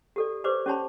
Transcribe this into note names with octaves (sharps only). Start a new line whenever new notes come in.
G4 A4 D5
G4 B4 C5 D5 D6
C#4 G4 C#5 A5 B5